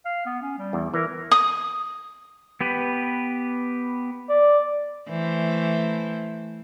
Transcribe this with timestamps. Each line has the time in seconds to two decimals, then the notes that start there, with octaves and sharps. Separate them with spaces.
0.05 F5
0.26 B3
0.42 C#4
0.58 G3
0.73 E2
0.94 E3 A#4
1.31 D#6
2.61 B3 G4 B4
4.29 D5
5.09 E3 A3 C5